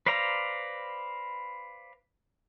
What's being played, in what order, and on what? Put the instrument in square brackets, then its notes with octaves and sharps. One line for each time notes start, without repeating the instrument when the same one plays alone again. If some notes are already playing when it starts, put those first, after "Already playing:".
[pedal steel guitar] B4 C5 D5 F5 A#5